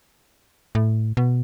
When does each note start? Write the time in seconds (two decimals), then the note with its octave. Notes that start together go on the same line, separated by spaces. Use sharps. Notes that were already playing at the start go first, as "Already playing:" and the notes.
0.75 A2
1.17 B2